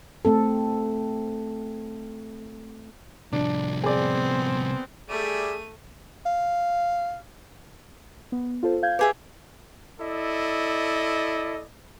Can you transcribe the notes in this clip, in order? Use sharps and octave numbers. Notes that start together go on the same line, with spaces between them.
A3 C4 A4
C2 F3 D4
B3 C4 G#4 D5
G3 A3 G#4 D5 E5 D#7
F5
B3
F4 A4 C5
F5 G6 G#6
G4 G#4 B4 E5
E4 A4 D5 D#5